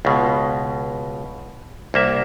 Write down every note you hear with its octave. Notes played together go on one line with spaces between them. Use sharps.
C#2 B2
C2 A#3 E5